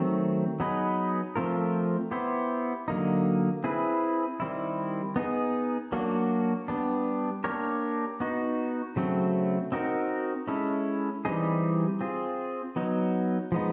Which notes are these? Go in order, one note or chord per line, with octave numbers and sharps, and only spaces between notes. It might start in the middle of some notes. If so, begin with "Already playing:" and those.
Already playing: D#3 F#3 A3 C4
F#3 B3 D#4 G#4 B4
F3 A3 C4 F4 A#4
B3 E4 G4 C5
D3 F#3 A#3 D#4
C4 E4 G#4 B4
D#3 G3 C4 E4
B3 D#4 G#4
F#3 A#3 D4 F#4
G3 B3 D4
A#3 D4 G4 A#4 C#5
B3 D#4 F#4
C#3 F#3 A3 C4
C4 D#4 F#4 A#4
G#3 C#4 E4 A4
E3 G3 C4 D#4 G#4
C4 F4 G#4
F#3 B3 D#4
F3 G#3 B3 D#4